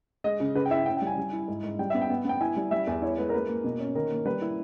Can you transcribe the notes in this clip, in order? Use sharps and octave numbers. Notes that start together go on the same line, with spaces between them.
G#3 D#5
C#3
C#3 B4
G5
E4 E5
C#4 G5
G5
G3
G#5
G3
E4
G#2
G#2
G3 G5
B3 E5
G5
B3
B3 G5
E4 G#5
G3
G3 E5
E2
E4 C#5
G#3 B4
A#4
A#3 B4
A#3
B2
C#4
D#3 A#4
A#3
G3 B4
E4